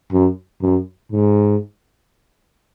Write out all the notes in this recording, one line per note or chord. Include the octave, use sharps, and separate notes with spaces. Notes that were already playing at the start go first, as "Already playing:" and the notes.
F#2
F#2
G#2